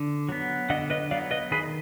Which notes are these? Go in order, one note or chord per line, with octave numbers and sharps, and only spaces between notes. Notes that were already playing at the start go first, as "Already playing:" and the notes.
Already playing: D3
F#3 B3
D3 D#5 F#5
B4 D#5
F#3 B3 D5 F5
B4 D#5
D#3 G#4 B4